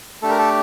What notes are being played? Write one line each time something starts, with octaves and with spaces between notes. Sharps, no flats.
A3 D4 G4 A4
A#4
A4